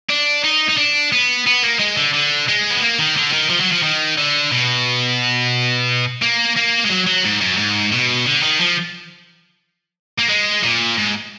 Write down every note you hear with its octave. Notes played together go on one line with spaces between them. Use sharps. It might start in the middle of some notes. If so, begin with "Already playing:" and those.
D4
D#4
D#4
D4
B3
B3
A#3
G#3
D3
D3
G#3
B3
A#3
D#3
D3
D#3
F3
F#3
F3
D#3
D3
B2
A#3
A#3
G#3
F#3
F#3
G#2
F#2
G#2
B2
D3
D#3
F3
A#3
G#3
A#2
G#2